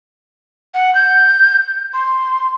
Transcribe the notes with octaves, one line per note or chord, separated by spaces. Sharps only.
F#5
G6
C6